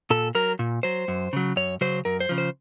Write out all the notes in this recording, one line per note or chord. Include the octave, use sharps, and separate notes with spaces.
A#2 A4
F#3 A#4
A#2
F#3 C5
F#2
C#3 F#3
F#2 C#5
C#3 F#3 C5
F#2 A#4
C5
C#3 F3
C5